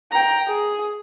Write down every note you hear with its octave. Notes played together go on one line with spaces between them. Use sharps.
G5 A#5
G#4